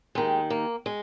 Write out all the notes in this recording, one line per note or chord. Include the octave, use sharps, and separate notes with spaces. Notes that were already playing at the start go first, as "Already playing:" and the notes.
D#2 D#3 G#3
A#3
G#3